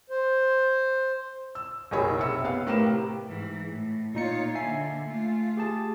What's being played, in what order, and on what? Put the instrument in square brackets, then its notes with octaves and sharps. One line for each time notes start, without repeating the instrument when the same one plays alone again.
[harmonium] C5
[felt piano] E6
F#1 B1 G#4 C#5 B5
C3 E5 E6 C#7
B3 F5
A2 G4 A#4 B4 E7
C3
[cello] G#2 E3
A2
[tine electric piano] A#2 D#4 C#7 [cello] F4 C#5
[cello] D3 A#3 [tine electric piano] E5 G#5 C7
[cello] A3 F4
[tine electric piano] G4 G#4 A5